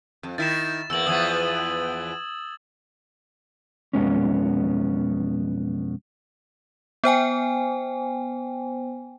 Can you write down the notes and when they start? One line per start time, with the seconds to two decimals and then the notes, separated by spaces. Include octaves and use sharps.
0.23 F2
0.38 D#3 E4 A6 E7
0.90 E2 A#3 E6 F#7
1.07 E2 F3 B3 D#6 E6 G#6
3.93 B1 F2 G#3 B3 C#4
7.04 B3 C5 G5 G#5